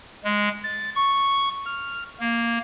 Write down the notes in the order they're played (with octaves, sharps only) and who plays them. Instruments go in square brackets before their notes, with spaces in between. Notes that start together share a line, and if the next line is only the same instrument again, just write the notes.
[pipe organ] G#3
A6
C#6
F6
A#3